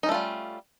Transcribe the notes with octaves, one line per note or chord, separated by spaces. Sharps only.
G3 A3 C#4 D#4 F4